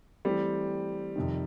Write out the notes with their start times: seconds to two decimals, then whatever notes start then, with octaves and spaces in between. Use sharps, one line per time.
0.25 E3 G3 A3 C4
1.16 F2 C3 D#3